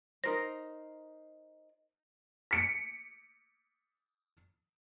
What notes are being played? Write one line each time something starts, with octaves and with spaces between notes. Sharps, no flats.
D#4 A#4 C5 A#6
B6 C#7 D7